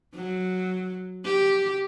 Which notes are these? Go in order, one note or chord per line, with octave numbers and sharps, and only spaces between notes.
F#3
G4